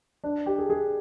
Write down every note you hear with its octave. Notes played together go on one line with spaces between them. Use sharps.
D4
G4
G#4
G#4